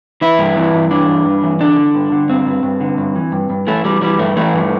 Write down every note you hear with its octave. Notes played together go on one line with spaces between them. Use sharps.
E3 E4
G2
E3
G2
E3 D4
G2
G2
E3
D3 D4
D3
G2
D3
G2 C4
G2
G2
D3
G2
E3
G2
G2
E3 A3
E3 G3
E3 G3
G2 A3
E3 A3
G2